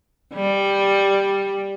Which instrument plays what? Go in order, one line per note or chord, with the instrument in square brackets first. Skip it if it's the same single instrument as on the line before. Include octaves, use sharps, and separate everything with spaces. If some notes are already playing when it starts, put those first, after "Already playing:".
[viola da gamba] G3